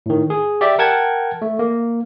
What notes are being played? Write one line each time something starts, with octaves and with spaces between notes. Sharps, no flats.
A2 D#3
G#4
G4 D5 E5 G5
A#4 F#5 G5 A5 G#6
A3
A#3